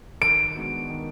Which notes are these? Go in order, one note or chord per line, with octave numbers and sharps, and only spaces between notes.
D#3 D7
G#3 B3 D4 F#4
D#3